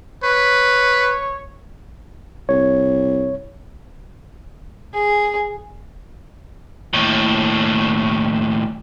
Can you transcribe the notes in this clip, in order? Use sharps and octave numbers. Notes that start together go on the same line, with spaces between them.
B4 C#5
C2 C#5
G#4
D#2 A2